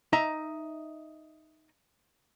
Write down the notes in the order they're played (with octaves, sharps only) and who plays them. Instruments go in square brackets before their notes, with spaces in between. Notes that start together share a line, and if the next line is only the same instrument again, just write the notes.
[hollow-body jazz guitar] D#4 E5 A#5